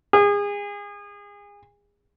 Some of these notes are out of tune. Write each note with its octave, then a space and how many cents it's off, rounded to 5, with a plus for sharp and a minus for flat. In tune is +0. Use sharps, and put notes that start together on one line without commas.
G#4 -30